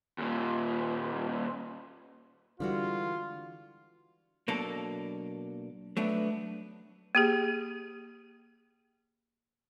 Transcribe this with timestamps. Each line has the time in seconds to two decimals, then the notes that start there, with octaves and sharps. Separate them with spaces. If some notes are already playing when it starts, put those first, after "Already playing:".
0.18 D#2 A#2
2.60 D3 E3 G3 G#3 F4 F#4
4.48 B2 F#3 A#3 D4 A4
5.97 F#3 A3 B3 D4
7.15 A#3 G4 G#4